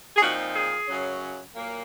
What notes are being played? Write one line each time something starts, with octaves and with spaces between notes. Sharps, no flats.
G#4
A#2 F3 C4 D#4 F#4
G#4
F#2 C#3 F#3 C#4
A#2 F#3 A#3